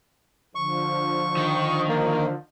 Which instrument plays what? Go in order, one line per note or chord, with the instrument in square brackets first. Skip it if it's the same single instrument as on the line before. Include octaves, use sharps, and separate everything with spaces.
[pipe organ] D3 F3 [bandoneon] C#6
[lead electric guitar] D#3
[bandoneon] A#3